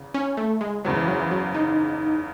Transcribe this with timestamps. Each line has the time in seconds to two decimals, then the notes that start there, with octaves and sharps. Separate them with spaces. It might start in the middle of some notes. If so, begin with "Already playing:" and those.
Already playing: E2 C#3
0.14 C#4
0.37 A3
0.61 G#3
0.84 F#1 E2 C#3 F#3 G#3
0.96 E3
1.08 F#3
1.20 E3
1.31 F#3
1.55 D#4